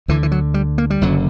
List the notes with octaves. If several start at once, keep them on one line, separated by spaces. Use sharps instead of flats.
D2 D3 E3
E3
F#3
G3
A#3
G3
F#1 F#2 D3 F#3